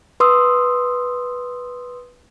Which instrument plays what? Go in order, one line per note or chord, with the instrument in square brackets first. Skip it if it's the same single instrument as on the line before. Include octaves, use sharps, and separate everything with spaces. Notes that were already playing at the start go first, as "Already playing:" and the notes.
[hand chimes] B4 C6 D#6 E6